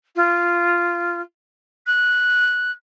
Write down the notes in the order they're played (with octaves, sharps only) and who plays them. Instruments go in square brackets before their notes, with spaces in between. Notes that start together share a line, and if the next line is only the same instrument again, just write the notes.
[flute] F4
F#6